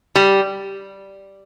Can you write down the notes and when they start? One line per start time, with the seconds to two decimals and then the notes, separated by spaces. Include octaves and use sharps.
0.16 G3